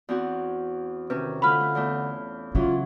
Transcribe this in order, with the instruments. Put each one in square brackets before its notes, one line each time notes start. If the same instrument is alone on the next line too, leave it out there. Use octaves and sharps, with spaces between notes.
[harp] E2 C4 F#4
[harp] C3 C#4 [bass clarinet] D#3 [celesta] B4
[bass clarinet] D3 [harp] A3 F4 B4 [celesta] B5 F6
[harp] A3
E2 A3
[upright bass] C#3 [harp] E3 F#3 [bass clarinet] F4